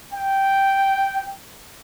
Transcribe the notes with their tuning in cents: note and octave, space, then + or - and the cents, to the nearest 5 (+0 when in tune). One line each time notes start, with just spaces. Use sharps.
G5 -5